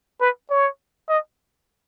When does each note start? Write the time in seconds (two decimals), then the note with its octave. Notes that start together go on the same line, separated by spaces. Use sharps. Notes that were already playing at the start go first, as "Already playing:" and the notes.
0.20 B4
0.50 C#5
1.09 D#5